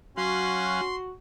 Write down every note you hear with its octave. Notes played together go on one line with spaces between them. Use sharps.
F#3 C#4 F#4 F5 C6 F#6